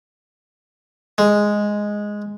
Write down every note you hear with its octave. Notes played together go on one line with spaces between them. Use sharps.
G#3